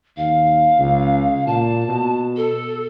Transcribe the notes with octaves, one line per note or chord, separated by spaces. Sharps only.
D#2 F5
C#2
A#2 A5
B2
A4